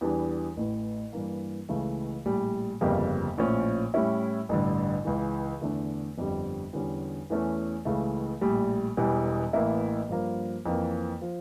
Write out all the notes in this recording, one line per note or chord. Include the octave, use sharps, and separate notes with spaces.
E2 E3 G3 D4
A1 A2 E3
G2 E3 A#3
C#2 C#3 E3 A3
A#1 A2 G3
G1 F2 C#3 G3 A#3
A#1 A2 F3 C#4
A2 G3 C#4 E4
A1 G2 D3
C#2 C#3 E3
E2 D3 A3 D4
G1 F2 D3 G3
E2 D3 G3 C#4
E2 E3 A3 C#4
C#2 C#3 E3 A3
A#1 A2 G3
E1 E2 E3 G3
A1 A2 E3 A#3 E4
G2 F3 A#3
F2 E3 A#3
F3